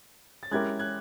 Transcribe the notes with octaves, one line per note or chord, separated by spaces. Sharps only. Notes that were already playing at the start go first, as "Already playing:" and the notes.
A6
G#3 C#4 E4 G4 A#4 F#6 G#6
F#6 G#6